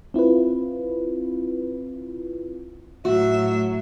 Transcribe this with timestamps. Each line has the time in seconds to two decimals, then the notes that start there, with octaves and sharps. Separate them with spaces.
0.14 C4 E4 F4 B4
3.05 A2 F#3 F#4 E5